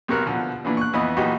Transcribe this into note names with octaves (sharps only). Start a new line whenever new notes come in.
B1 C3 F#4 A#4 F#5 F#6
B2 D3 F3
A#2 E3 B3 D4
C#6 F#6
F2 E3 B3 D#5 D#6
A#1 E3 F#3 D#4 F#4 G4